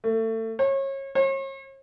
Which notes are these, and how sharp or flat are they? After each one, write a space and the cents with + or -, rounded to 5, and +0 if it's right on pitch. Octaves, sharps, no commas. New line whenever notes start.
A3 +30
C#5 -30
C#5 -40